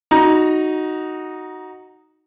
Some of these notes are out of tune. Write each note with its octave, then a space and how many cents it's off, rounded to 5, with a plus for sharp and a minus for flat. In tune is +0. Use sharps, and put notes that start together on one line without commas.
D#4 +0 F#4 +0 A#5 +20